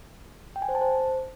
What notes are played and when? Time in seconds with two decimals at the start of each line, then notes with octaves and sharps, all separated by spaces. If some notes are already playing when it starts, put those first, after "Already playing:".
0.56 G5
0.62 G#5
0.69 C5
0.75 A5
0.81 C5